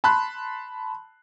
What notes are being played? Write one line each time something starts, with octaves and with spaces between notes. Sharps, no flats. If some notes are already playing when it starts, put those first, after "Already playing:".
A5 B5 C6 F#6